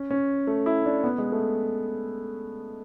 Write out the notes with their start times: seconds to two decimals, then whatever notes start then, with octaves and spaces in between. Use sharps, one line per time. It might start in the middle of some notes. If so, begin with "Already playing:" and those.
Already playing: C#4
0.11 C#4
0.47 A3
0.66 E4
0.86 D4
1.04 B3
1.18 G#3
1.32 A3